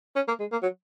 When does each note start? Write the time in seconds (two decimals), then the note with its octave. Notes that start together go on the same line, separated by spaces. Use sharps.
0.16 C#4
0.28 A#3
0.40 G#3
0.52 A#3
0.62 F#3